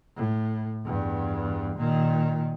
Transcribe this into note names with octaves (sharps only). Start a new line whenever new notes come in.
A2
E2 G2
A#2 D#3